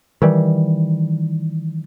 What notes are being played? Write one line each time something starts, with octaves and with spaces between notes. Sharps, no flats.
D#3 E3 G3